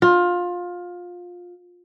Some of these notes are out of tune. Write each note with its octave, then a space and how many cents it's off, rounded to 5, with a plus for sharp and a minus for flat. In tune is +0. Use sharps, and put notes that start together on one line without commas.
F4 +20